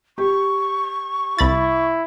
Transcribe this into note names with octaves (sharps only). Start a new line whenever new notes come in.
G4 C#6
C2 E4 B5 A6